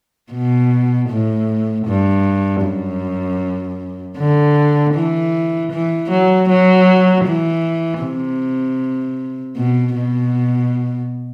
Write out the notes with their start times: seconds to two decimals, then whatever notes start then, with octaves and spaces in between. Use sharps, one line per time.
0.33 B2
1.09 A2
1.87 G2
2.64 F#2
4.17 D3
4.94 E3
5.71 E3
6.10 F#3
6.49 F#3
7.25 E3
8.02 C3
9.57 B2
9.95 B2